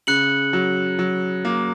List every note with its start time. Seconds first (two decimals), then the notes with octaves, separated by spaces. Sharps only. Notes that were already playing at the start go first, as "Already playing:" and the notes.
0.07 C#3 F#6 C#7 F#7
0.53 F#3
0.99 F#3
1.45 A#3